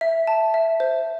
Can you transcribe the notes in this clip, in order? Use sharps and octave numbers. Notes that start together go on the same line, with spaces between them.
E5
A5
E5
C5